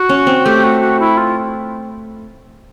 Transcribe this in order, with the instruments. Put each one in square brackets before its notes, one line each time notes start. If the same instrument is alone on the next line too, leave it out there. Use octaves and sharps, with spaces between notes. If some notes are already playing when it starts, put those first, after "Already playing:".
Already playing: [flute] F#4
[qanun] C#4
C4
[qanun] A3 [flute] G4
[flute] F#4
F#4
E4
F4